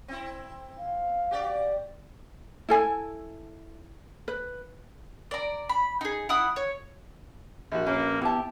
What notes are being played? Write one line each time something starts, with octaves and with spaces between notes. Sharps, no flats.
C4 E4
F5
F#4 G4 D5
E4 A4 G#5
B4
D5 A#5
B5
D#4 G#4
E4 F#5 D#6
C#5
A#1 F#4
A#3 C#4 B4
B3 E4 G4 A5